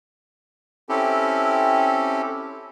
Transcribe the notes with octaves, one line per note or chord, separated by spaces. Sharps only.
C4 C#4 E4 G4 A4